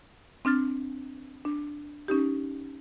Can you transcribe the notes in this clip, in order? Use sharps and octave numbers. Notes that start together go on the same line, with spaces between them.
C4 D4 F6 A6
D4
C#4 D#4 G4